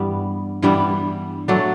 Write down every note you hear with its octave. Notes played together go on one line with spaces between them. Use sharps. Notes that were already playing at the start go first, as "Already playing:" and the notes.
Already playing: G2 E3 G3 B3
G2 E3 G3 B3
F#3 A3 D4